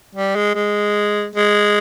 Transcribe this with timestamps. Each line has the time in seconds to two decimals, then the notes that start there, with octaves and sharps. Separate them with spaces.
0.15 G3
0.35 G#3
0.55 G#3
1.35 G#3